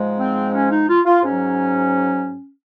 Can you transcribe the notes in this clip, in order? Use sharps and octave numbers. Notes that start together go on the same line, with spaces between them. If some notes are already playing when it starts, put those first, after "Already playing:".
Already playing: G#2 F3 G#3
C4
C#4
D#4
F4
F4
G#2 F#3 C#4